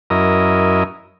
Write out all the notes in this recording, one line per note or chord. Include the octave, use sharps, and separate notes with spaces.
F#2 E4 A#4 D#5